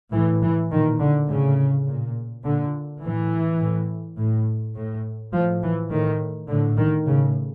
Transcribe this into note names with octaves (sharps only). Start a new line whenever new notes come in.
A2 E3
E3
A#2 D#3
D3
A2 C#3
A#2
A#2 D3
A2 E3
A2
A2
A2
A2 F3
E3
A2 D#3
A2 D3
D#3
A2 C#3